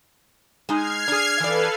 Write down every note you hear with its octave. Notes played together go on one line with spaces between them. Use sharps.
G#3 D#4 F6 G#6 C7
D4 G#4
E3 A4 B4 D5 F5